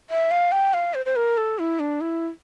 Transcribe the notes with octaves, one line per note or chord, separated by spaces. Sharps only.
E5
F5
G5
F5
C5
C5
A#4
A4
E4
D4
E4